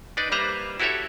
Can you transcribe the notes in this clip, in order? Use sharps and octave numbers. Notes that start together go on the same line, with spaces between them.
D4 D#4 B4 D5
G3 A#3 B4 C5 E5 A#5
E4 F#4 G4 A4 C#5 E5